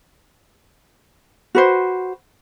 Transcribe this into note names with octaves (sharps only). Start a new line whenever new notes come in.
F#4 B4 C5